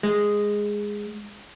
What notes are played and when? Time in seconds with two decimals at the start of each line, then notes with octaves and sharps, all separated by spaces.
0.03 G#3